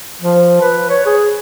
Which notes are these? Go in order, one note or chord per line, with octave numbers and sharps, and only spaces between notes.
F3
B4
C#5
G#4